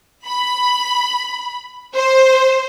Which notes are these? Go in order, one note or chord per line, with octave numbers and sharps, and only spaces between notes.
B5
C5